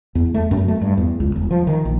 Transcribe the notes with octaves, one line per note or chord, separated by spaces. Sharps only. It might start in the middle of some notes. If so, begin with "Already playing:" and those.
E2
A3
F#2
A3
G2
E2
C#2
E1
F3
D#3
A#1